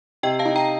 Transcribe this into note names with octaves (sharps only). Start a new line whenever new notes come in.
C3 D#5 G5
F5 A5
D#4
G5 A#5